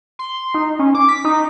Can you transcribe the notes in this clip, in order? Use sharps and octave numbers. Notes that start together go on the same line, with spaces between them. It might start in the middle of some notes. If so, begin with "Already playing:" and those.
C6
D#4
C#4
D6
B6
D#4